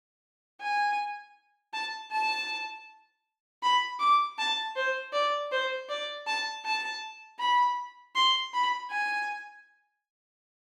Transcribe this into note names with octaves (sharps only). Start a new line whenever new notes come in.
G#5
A5
A5
B5
D6
A5
C5
D5
C5
D5
A5
A5
B5
C6
B5
G#5